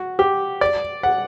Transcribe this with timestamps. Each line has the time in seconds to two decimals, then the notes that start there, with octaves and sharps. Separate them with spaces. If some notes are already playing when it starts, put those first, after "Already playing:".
Already playing: F#4
0.19 G4
0.61 D5
1.03 F#5